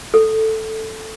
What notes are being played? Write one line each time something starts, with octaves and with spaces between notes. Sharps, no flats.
A4